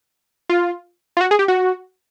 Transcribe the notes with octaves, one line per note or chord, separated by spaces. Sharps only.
F4
F4
F#4
G#4
G4
F#4